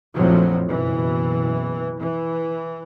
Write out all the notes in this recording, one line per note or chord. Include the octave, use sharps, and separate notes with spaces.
A#1 F2 A2 F3 F#3
F#1 B2 E3
E3